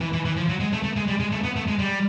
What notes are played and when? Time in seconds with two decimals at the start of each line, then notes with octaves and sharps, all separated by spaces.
0.01 E3
0.13 E3
0.25 E3
0.37 F3
0.49 F#3
0.60 G#3
0.73 A3
0.84 A3
0.96 G#3
1.08 G3
1.20 G#3
1.32 A3
1.44 B3
1.56 A3
1.68 G#3
1.79 G3